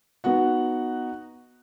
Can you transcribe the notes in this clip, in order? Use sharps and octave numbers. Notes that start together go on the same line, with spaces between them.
B3 D#4 F#4 F#5